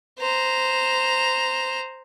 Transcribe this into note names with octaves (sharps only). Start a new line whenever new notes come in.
C5 A#5